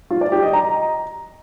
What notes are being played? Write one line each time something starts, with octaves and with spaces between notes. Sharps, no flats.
F4
D5
G4
D#5
A#5